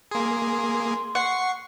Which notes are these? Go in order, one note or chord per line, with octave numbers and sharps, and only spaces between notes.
A#3 G#4 C6
F#5 C#6 C7